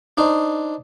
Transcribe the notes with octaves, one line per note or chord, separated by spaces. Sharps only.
D4 D#4 C5